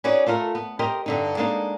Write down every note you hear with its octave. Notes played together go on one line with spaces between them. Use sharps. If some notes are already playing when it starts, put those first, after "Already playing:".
C#4 D#4 F#4 G#4 B4 D5
A3 F4 A4 A#4
B3
G4 A#4 C5 D#5
G2 D3 D#4
G#3 A#3 B3 D4 D#4